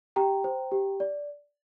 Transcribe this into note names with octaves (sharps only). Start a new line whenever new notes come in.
G4 G5 A#5
C5
G4
D5